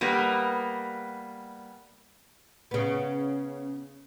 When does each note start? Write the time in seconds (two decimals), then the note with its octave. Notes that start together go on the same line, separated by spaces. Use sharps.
0.01 G3 A#3 B3
2.71 C#3 B3